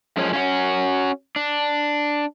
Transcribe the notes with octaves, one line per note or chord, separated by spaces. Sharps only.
F#2 F3 G#3 C#4
C#4 F4 F#4
D4